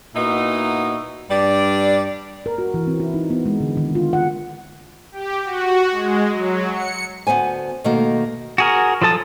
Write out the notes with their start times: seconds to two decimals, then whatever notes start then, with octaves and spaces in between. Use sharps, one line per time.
0.15 A#2 B3 D#4 E4 F#4 D#5
1.30 G2 G3 D4 D5
2.46 A#4
2.58 F#4
2.74 E3
2.87 C4
3.00 E4
3.14 D#4
3.30 B3
3.46 G#3
3.60 D3
3.77 D#3
3.95 F4
4.13 F#5
5.12 G4
5.45 F#4
5.92 G#3
6.31 F#3
6.74 C#7
7.27 D2 B2 B3 C5 G#5
7.84 B2 D#3 A3 A#3
8.58 F#4 G#4 A#4
9.02 F3 F#3 A4 A5 D#6